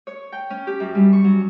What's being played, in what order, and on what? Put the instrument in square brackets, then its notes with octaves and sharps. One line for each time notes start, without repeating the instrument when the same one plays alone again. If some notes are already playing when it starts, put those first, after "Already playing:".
[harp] C#5
G5
C#4
G4
F#2
G3
C#6
F#3